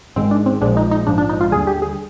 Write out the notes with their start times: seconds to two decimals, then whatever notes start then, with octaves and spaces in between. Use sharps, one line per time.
0.16 G#1 G#2 D#3 G#3 C4
0.31 D4
0.46 C4
0.61 A#1 A#2 F3 G#3 D4
0.77 D#4
0.91 D#4
1.07 A#1 G#2 F3 D4
1.18 D4
1.29 D#4
1.41 F4
1.51 D#2 D3 G3 G#4
1.67 G4
1.82 G#4